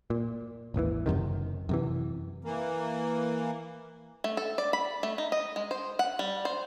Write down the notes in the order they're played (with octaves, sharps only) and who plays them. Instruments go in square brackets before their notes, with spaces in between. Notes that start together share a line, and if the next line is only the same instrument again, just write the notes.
[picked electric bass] A#2
G#1 D#2 D#3 E3
F#1 F#2 C3 D#3
F#2 C3 E3
[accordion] E3 A#3
[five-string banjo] A3
A4
D5
B5
A3
D#4
D#5
G#3
C5
F#5
G3
C5